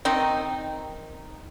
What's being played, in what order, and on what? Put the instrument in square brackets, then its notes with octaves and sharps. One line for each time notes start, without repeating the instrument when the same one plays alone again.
[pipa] D#3 C4 D#4